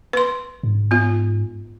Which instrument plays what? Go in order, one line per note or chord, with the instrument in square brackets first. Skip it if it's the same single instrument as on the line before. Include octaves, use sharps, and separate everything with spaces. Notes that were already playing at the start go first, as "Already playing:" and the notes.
[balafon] B4 C6
[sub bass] G#2
[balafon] B3 F4